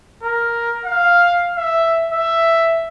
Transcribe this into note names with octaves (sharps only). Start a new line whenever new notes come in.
A#4
F5
E5
E5